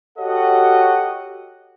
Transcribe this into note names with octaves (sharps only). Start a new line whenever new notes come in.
F#4 G4 A4 C#5 D#5 F#5